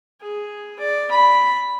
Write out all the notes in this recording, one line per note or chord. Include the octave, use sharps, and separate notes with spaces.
G#4
D5
B5